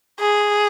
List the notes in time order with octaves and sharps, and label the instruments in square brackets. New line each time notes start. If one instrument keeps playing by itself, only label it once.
[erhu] G#4